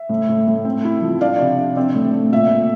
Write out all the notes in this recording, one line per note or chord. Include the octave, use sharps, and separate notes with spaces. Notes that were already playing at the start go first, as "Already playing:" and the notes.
Already playing: E5
A2
A2
A2
C4
E4
F3
D4 D5 F5
C3
D4
C4 D5
A2
A3
A#2 E5
A#2